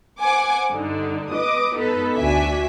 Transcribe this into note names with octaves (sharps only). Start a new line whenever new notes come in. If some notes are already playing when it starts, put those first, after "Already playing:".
C5 F#5 G#5 D6
G2 D3 D4 D#4
B4 D#5 D6 D#6
B3 D#4 A4 B4
D2 D4 F#4 E5 G#5 B6